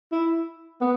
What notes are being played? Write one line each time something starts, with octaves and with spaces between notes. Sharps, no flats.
E4
B3